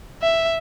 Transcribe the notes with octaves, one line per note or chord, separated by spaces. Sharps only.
E5